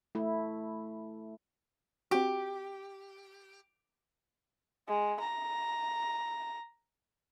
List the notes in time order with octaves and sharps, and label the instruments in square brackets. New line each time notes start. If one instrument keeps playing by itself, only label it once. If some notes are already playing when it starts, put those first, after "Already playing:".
[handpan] A3 E4
[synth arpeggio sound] C4 F#4 [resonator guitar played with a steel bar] G4
[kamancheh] G#3
A#5